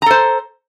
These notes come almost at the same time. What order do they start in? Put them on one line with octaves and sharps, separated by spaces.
A#5 A4 C5